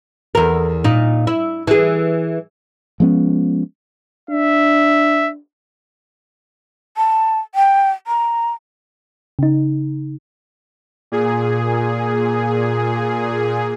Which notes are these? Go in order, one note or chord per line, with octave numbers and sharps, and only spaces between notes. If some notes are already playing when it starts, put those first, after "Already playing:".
E2 A#4
A#2 D#4
E4
E3 G#4
F3 G#3 B3 C#4
D4 E5
A5
G5
A#5
C#3 D#4
A#2 G#4